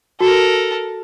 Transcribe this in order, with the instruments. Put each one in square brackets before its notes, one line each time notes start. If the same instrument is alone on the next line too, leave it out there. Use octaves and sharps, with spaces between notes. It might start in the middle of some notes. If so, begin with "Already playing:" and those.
[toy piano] F#4 [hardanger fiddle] A4 A#4